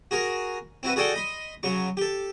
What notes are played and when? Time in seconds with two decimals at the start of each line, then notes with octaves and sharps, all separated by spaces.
0.11 F#4 G#4 A#4
0.83 C4 E4 F#4 B4
0.96 F#4 G#4 A4 D5 F#5 G5
1.14 D#5 B5 C6
1.63 C#3 F#3 C#6
1.97 G4 A4